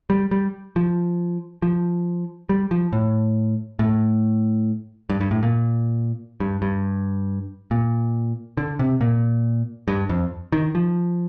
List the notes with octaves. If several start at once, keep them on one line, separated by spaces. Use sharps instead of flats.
G3
G3
F3
F3
G3
F3
A2
A2
G2
G2
A2
A#2
G2
G2
A#2
D3
C3
A#2
G2
F2
D#3
F3